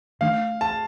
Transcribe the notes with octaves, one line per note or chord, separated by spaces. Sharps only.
D#3 A3 D4 F5
A5